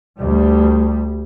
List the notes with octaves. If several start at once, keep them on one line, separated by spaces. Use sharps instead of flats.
D2 G3